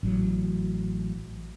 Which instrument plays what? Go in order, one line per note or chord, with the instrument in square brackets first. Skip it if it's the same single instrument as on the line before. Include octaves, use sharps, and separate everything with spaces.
[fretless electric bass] A1 F#3